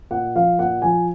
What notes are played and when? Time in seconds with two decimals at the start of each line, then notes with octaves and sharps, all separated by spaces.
0.11 A#2 F#5
0.35 F3 F5
0.59 A#2 F#5
0.82 F3 G#5